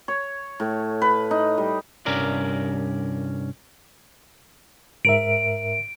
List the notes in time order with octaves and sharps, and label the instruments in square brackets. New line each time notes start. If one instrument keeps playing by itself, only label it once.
[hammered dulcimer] C#5
A2
B4
D#4
G3
[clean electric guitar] C2 G2 C#4 A#4 D5
[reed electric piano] G#2 A#4 E5 [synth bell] D7